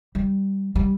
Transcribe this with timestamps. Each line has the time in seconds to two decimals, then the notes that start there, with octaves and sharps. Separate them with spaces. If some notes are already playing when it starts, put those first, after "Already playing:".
0.15 G3
0.75 G3